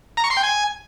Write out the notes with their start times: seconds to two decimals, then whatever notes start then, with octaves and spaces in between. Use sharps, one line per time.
0.17 A#5
0.24 C#6
0.30 C6
0.37 G5
0.43 G#5